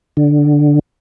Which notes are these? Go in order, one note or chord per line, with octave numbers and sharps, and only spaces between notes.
D3